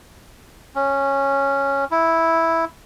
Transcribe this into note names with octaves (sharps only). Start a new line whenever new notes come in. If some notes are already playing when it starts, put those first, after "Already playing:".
C#4
E4